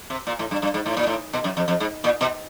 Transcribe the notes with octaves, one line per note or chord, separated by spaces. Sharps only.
C3
A#2
A2
G2
G2
G#2
A2
A#2
A2
B2
F#2
F2
F2
G#2
A#2
B2